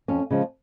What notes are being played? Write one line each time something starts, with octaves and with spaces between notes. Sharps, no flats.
F2 C#4
C#3 F3 G#3